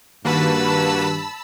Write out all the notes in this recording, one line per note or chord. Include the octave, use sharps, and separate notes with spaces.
G2 D#3 A#3 F#4 B4 A5 B5 E6